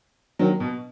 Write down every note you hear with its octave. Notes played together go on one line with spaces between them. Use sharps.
D#3 F#3
B2